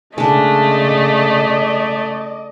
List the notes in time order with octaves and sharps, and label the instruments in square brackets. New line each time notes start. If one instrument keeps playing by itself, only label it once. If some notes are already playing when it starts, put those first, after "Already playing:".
[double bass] C#3 [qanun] G#3 D4 [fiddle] A3 [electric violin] D5 D#5